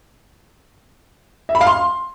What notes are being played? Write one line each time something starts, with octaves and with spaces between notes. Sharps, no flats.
E5
B5
F5
C6